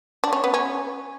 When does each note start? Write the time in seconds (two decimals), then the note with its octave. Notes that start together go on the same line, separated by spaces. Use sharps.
0.24 D4
0.33 C#4
0.44 B3
0.54 C#4